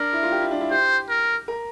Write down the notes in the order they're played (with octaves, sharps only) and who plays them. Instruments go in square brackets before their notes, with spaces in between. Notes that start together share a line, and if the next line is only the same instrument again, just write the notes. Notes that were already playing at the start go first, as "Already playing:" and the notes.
Already playing: [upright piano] D4 [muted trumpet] A#4
[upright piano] E4
F4
G4
E4
D4
E4
[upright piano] G4 [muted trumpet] C5
[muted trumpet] A#4
[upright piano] A#4